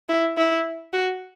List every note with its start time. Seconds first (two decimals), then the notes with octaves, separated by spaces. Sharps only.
0.09 E4
0.37 E4
0.93 F#4